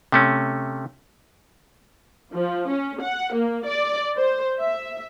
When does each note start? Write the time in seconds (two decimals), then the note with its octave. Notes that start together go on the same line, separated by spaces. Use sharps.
0.12 C3 A3 C#4
2.33 F3
2.70 C#4
3.01 F#5
3.34 A#3
3.66 D5
4.17 C5
4.60 E5